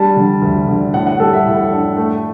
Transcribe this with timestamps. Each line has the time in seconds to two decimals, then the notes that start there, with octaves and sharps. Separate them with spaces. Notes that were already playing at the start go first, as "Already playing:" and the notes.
Already playing: G3 D4 A5
0.16 D3
0.42 D2
0.67 D3
0.93 A2 F#5
1.07 F#5
1.20 G3 A4
1.33 E5
1.46 A2
1.72 D4
1.97 A3